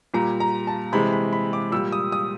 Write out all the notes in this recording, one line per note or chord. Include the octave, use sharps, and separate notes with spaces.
A#2 G3 A#5
A#5
A5
C3 E3 G#3 B5
B5
B5
D6
A#2 G3 E6
D#6
D#6